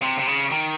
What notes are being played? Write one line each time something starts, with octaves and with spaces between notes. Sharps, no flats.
C3
C3
C#3
D#3